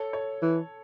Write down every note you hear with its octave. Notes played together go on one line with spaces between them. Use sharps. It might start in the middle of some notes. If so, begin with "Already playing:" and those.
Already playing: A4 C#5
A4 C#5
E3